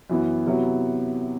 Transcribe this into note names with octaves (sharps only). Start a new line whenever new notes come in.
F#2 E3 B3 E4
C3 F#3 B3 E4